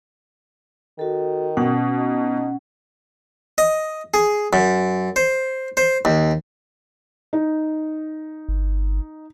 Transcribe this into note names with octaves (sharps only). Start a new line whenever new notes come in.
D#3 F#4 A4
B2 C#4 F#5
D#4
D#5
G#4
F#2
C5
C5
D#2
D#4
G1